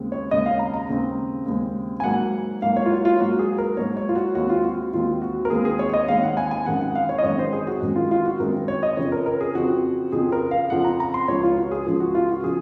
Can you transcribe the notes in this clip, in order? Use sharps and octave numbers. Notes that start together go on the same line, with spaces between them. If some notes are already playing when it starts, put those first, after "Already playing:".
Already playing: D#2 C#3 G#3 C4
C#5
D#2 C#3 G#3 C4 D#5
F5
A#5
A#5
D#2 C#3 G#3 C4
D#2 C#3 G#3 C4
G#5
G#2 F#3 A#3 F#5
G#2 F#3 A#3 F5
C#5
F4
F#4
F4
G#2 F#3 A#3 F#4
G#4
A#4
G#2 F#3 A#3 C#5
C#5
F4
F#4
D#2 D#3 G#3 C4 F#4
F4
F#4
D#2 D#3 G#3 C4 F4
F#4
A#4
D#2 D#3 G#3 C4 G#4
G#4
C#5
C#5
D#5
D#2 D#3 G#3 C4 F5
F#5
G#5
G#5
F#2 D#3 G#3 C4 F#5
F#5
F5
C#5
D#5
F#2 D#3 G#3 C4 C#5
C5
G#4
F#4
F#2 D#3 G#3 C4
F4
F4
F#4
F#2 D#3 G#3 C4 A#4
C#5
D#5
F2 C#3 F3 C4 C#5
A#4
A#4
G#4
F2 C#3 F3 C4 F#4
F2 C#3 F3 C4 G#4
A#4
F5
F2 C#3 F3 C4 F#5
A#5
A#5
C6
C#2 C#3 F3 C#5
F4
F#4
G#4
C#2 C#3 F3
F#4
F4
F#4
C#3 F3 G#4